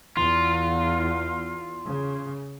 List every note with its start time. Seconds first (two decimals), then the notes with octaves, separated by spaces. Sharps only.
0.17 E2 F4
1.88 C#3